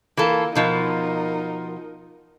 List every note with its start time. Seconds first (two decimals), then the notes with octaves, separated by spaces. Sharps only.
0.17 E3 A#3 F4 A4
0.55 B2 F3 D#4 F4 A#4